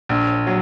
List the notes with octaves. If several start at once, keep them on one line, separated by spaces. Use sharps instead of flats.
A#1
F#3